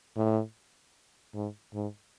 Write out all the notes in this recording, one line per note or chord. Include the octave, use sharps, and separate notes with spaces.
A2
G#2
G#2